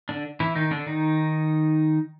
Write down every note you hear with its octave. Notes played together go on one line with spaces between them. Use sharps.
D3 D4
E3 E4
D#3 D#4
D3 D4
D#3 D#4